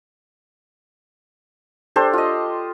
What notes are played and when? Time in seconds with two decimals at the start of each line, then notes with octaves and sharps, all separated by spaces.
1.96 D4 G4 A4 C5
2.13 F4 D#5